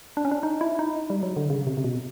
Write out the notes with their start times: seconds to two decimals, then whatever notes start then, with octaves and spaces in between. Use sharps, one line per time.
0.17 D4
0.25 C#4
0.32 D4
0.43 D#4
0.61 E4
0.79 D#4
1.10 G3
1.23 F#3
1.36 D3
1.50 C#3
1.67 C3
1.77 C3
1.84 B2